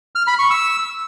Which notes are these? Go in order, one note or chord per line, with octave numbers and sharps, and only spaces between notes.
F6
B5
C#6
E6